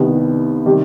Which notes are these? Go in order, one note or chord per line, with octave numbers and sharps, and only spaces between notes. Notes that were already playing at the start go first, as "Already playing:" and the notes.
Already playing: C2 C3 D#3 G3 B3
C3 D#3 G3